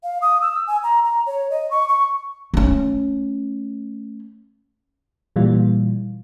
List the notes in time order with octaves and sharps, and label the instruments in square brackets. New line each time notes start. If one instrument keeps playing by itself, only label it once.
[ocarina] F5
D#6
E6
G#5
A#5
A#5
C#5
D#5
C#6
C#6
[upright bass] A3 C#4
[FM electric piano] A#2 E3 G3 F4